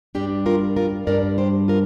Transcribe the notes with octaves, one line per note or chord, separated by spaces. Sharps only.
G2 G3 D4 G4
F4 A#4
F4 A#4
G2 G3 D4 A#4 D5
G4 C5
F4 A#4